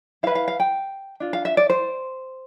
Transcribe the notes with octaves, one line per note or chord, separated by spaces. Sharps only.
E4 B4 F5
F5
F5
G5
D4 F4
F5
E5
D5
C5